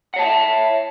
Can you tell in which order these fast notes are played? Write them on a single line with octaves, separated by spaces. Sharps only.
F#5 C#5 A5 D#5 E5